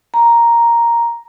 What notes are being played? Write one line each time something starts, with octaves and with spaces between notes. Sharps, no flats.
A#5